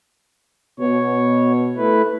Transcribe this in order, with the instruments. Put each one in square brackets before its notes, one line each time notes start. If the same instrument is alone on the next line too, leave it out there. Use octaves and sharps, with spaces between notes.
[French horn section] B2 B3 [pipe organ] C#5
[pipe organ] A3 E4 B4